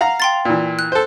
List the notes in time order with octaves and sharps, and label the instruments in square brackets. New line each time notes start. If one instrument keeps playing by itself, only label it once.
[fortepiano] F5 F#5 A#5
[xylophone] G5 C6 A6
[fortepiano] A#2 E3
[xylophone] F#6
[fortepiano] A4 C5